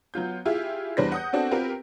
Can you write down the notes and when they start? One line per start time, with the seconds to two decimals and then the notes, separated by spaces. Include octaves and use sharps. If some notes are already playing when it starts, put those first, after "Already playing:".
0.14 F#3 B3 F4 G6
0.45 E4 F4 G4 G#4 E5
0.97 E2 G3 D4 B4 C5 A#6
1.12 F#5 D#6 G6
1.33 B3 C4 D4 F#4 A4
1.51 C4 F4 G4 A#4 B4